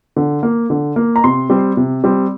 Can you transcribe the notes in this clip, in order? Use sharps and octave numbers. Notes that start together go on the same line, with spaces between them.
D3
A#3
D3
A#3
A#5
C3 C6
G3 C4
C3
G3 C4